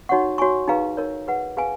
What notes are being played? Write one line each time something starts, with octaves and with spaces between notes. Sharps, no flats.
D#4 F#4 C#5 F#5 C#6
F#4 C#5 G#5 C#6
D#4 G#4 B4 F5 A#5
D#4 A#4 C#5
G#4 B4 F#5
G#4 B4 F5 G#5